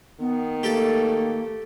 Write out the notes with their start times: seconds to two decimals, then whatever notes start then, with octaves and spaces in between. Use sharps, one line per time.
0.20 D#3 B3
0.63 A3 A#3 G4 A4